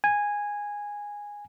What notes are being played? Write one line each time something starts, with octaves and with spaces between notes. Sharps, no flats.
G#5